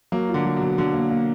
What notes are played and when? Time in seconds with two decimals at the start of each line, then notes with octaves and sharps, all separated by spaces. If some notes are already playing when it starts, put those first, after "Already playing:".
0.12 F#3 A#3
0.29 F4
0.34 D3
0.45 F#3
0.56 B2
0.61 F#3
0.78 D3 F#3
0.94 A#3
1.10 A#3